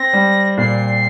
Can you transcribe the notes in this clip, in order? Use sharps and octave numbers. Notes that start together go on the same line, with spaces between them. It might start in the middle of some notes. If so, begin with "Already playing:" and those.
Already playing: C4 A#6
G3
A#2 C7